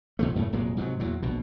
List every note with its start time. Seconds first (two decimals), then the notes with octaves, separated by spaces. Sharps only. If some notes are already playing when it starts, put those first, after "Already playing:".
0.19 B2 F3 A3
0.36 F#2 A2 C#3 A3
0.53 F1 A#2 F#3 G#3
0.77 G#2 C3 E3 F#3
1.00 E2 A#2 F#3
1.22 A#1 B2